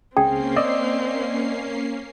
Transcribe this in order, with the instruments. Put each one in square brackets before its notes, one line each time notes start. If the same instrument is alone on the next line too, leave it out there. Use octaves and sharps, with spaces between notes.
[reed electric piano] C#2 C#3 G#4 [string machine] A#3 C#4 C7 [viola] C4 [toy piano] G5
[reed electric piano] D5 D#5 E6